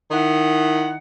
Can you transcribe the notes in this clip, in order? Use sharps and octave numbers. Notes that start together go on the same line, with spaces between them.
D#3 E4 F#5